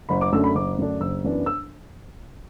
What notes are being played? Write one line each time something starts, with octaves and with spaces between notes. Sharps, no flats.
F#1 B5
D6
F#2 D3 A3 D4 E6
B5
F#1 D6
F#2 D3 A3 D4
F#1 E6
F#2 E3 B3 D4
E6